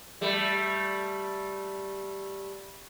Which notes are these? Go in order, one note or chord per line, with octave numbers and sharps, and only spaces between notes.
G3 A3